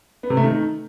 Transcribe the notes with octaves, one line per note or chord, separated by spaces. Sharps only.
B3
C3
A3
D#3